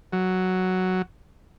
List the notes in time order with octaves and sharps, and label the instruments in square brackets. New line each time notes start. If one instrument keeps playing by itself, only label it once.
[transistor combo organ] F#3